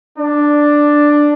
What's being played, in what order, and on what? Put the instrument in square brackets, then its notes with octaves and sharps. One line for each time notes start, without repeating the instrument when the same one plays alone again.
[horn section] D4